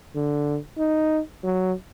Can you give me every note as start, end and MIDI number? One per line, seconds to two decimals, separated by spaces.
0.15 0.58 50
0.78 1.20 63
1.43 1.72 54